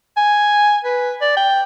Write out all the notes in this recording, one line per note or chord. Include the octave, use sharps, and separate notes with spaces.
G#5
B4
D5
G5